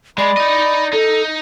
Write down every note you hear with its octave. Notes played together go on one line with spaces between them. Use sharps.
G#3 D5 B5
D#4 D#5
D#4 A4